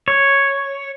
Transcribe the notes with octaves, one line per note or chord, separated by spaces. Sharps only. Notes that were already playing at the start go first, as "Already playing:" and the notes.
C#5